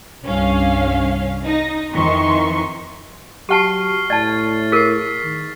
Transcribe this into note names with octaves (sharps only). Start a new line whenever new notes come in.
C2 G2 C#4 F5
D#4 A#6
F2 D#3 E3 C6 C#6
F#3 G4 F#5 A5 C#6 F6 C7
A2 D5 A5 A6
G#4 A#4 B6 C7
D#3